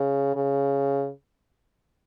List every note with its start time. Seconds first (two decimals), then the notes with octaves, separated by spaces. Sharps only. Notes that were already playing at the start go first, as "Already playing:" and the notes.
Already playing: C#3
0.35 C#3